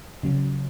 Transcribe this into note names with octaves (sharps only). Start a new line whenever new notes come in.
C#3 F#3